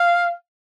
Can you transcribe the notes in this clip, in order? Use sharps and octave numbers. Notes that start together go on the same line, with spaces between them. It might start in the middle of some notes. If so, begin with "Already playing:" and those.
Already playing: F5